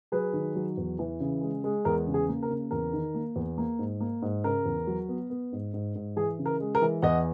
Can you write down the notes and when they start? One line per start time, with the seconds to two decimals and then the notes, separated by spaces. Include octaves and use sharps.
0.12 F#3 G#4 B4
0.33 D#3
0.55 F#3
0.77 E2
0.99 E3
1.20 C#3
1.41 G#3
1.64 G#3
1.85 E2 A#4
2.07 C#3
2.14 G#4
2.28 A#3
2.43 A#4
2.50 C#3
2.71 E2 A#4
2.93 D#3
3.15 A#3
3.36 E2
3.58 A#3
3.79 G#2
4.00 A#3
4.22 G#2
4.44 C#3 A#4
4.66 E2
4.87 F#3
5.09 B3
5.30 B3
5.52 G#2
5.74 G#2
5.95 G#2
6.16 E3 G#4
6.39 C#3
6.46 A#4
6.60 G#3
6.75 A#4
6.82 E3
7.02 E2 D#5 F#5